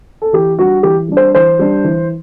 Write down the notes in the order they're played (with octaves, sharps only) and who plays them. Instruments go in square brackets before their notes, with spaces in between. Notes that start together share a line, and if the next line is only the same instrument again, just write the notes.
[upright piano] A4
E3 G4
G3 D4 F#4
E3 G4
G3 D4
C5
E3 C5
G3 D4
E3